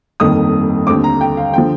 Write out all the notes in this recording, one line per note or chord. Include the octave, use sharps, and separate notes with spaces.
G1 F2 D#3 A#3 D#6
D#2 D3 A3 C4 D6
A#5
G5
F5
D3 F3 G5